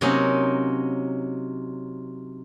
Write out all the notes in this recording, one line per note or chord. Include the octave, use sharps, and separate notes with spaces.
C3 F#3 A#3 C#4 D#4